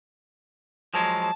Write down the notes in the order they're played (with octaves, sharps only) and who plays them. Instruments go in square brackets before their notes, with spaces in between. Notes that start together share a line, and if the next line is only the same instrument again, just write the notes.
[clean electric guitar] F3 F#3 G#3 [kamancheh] A5